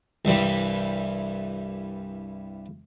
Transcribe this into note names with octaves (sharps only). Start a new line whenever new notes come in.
C2 G2 E3 G3